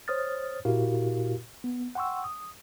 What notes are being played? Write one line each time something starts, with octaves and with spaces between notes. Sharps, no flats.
C5 C#5 D#6 F6 A6
A#2 E4 F#4 G4 A#4 F5
B3
F#5 G5 C6 C#6 E6
D#6